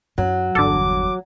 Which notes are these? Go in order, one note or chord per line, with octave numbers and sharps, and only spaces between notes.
F#2 F#3
G1 E2 D3 A4 D6